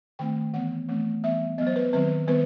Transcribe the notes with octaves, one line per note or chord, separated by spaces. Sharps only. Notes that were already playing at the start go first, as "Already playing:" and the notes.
D#3 A3 C4 G5
E3 B3 F#5
E3 A3 C4
E3 G3 B3 E5
F#3 B3 C5 D#5
B4
D#3 F#3 C4 B4
D#3 G3 B3 B4